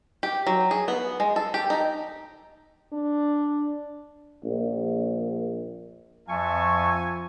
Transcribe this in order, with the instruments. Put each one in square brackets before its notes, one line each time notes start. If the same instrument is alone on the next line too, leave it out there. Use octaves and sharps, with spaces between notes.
[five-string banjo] G4
F#3
G#4
B3
G#3
A4
G4
D#4
[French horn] D4
[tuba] A#1
[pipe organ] F2 C#6 [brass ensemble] F3 [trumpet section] E5 A5 [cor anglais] G#5